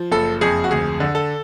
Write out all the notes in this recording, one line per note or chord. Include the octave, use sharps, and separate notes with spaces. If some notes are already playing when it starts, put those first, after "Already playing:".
Already playing: F3
F#1 A4
F2 G#4
F#4
D2 G#4
D3
A4